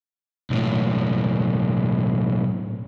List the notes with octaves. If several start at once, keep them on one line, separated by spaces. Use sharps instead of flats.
B1 A2